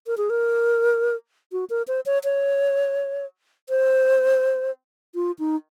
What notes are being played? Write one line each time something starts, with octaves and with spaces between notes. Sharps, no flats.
A#4
G#4
A#4
F#4
A#4
C5
C#5
C#5
C5
F4
D#4